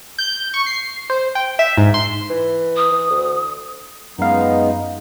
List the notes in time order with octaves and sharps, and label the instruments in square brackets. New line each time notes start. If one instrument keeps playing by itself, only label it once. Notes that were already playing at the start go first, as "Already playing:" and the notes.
[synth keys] G6
C#6
C7
C5
G5
E5
G#2
C6
[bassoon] E3
[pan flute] D#6
[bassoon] E3
D2
[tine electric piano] F#2 F5 [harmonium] G#3 B3 D#4